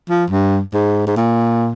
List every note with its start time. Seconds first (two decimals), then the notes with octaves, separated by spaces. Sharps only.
0.10 F3
0.30 G2
0.74 G#2
1.07 G#2
1.17 A#2